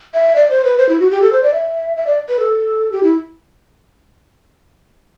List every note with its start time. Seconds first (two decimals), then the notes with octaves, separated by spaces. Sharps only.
0.14 E5
0.36 D5
0.50 C5
0.65 B4
0.78 C5
0.89 E4
1.00 F#4
1.11 G4
1.22 A4
1.33 C5
1.43 D5
1.54 E5
1.97 E5
2.07 D5
2.29 B4
2.39 A4
2.92 G4
3.03 E4